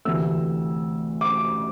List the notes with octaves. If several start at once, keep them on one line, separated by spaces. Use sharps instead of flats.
D2 C3 E3 A3 E6
D6